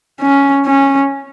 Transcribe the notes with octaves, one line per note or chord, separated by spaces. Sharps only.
C#4
C#4